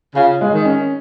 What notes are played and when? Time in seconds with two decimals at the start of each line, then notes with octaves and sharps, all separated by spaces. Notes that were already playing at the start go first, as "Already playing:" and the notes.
0.15 C#3 F4
0.41 G#3
0.53 D#3
0.65 C#4